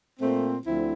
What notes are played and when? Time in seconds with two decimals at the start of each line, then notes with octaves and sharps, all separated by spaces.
0.20 A#2 A3 C4
0.66 D2 D3 F3 C4 E4